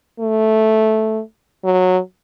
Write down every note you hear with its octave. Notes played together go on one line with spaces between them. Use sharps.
A3
F#3